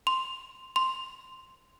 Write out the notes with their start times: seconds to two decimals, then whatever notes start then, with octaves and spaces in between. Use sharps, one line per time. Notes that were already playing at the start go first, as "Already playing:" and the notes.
0.07 C6
0.76 C6